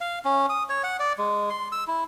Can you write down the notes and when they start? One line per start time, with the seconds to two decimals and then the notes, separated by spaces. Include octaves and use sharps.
0.01 F5
0.25 C#4
0.50 D#6
0.69 C#5
0.84 F#5
0.99 D5
1.18 G#3
1.50 C6
1.72 E6
1.88 E4